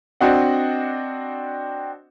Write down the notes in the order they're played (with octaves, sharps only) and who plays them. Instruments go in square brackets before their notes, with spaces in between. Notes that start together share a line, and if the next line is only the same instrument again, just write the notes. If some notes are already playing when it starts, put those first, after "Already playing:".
[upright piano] C4 D4 F#4 D#5 F#5